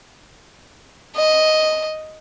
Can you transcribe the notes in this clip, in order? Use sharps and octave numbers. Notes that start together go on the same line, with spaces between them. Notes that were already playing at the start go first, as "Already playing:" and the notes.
D#5